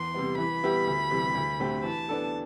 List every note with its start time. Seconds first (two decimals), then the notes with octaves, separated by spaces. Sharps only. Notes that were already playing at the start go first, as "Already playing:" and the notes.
Already playing: E2 C6
0.14 C3 G3 B3
0.38 E3 B5
0.63 G3 B3 E4 G4
0.87 D2
1.11 C3 E3 G3
1.35 D2
1.60 D3 A3 C4 G4
1.83 E3 A5
2.09 B3 D4 A4